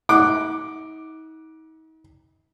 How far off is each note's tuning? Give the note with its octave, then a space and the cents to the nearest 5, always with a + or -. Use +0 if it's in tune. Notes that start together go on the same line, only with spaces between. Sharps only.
D#4 +40 F#5 +0 D6 +0